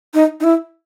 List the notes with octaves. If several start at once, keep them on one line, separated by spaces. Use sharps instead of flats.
D#4
D#4
E4